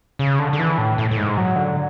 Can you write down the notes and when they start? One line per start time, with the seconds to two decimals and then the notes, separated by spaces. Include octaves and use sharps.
0.19 C#3
0.39 D3
0.53 D3
0.59 E3
0.78 A2
0.98 A2
1.11 A2
1.17 G#2
1.38 F#3
1.56 D3